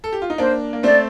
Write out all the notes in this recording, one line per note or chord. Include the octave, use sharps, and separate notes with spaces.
A4
G4
F4
D#4
A#3 D4 C5
A#3
A3 C4 D5